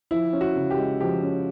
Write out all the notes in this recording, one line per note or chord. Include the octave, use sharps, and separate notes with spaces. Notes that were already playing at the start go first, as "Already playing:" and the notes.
F3 E4
C#4
F#4
C#3
G4
G#3
F3 G4
C#4